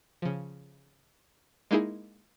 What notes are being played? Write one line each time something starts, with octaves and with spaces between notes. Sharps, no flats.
C#3 F3
G#3 A#3 D#4 E4 G#4